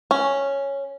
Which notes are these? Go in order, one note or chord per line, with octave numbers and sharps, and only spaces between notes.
C#4